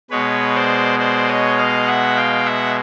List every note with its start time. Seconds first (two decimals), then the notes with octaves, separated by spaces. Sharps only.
0.11 B2 G#3 B4 C#5
0.55 C5 D5
0.99 C5 D5
1.28 C#5 D#5
1.58 D#5 F5
1.87 E5 F#5
2.16 F5 G5
2.46 E5 F#5